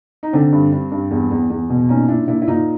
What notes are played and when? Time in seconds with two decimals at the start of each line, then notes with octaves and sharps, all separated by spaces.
0.23 D#4
0.33 D3 C4 D4
0.52 G2
0.72 G2
0.92 G2
1.11 E2
1.31 E2
1.50 E2
1.70 B2
1.89 A#2 C#4 D#4
2.09 A#2 D4 E4
2.28 A#2 D4 E4
2.42 E4
2.48 A#2 D#4 F4